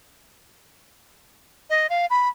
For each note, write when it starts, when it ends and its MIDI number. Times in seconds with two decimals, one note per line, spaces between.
1.70 1.87 75
1.90 2.06 77
2.10 2.29 83